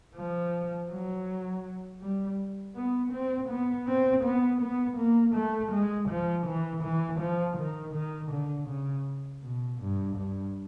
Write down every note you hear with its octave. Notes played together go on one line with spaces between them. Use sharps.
F3
F#3
G3
B3
C4
B3
C4
B3
B3
A#3
A3
G#3
F3
E3
E3
F3
D#3
D#3
D3
C#3
B2
G2
G2